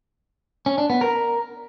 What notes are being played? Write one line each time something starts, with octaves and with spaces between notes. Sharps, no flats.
C#4
D4
B3
A#4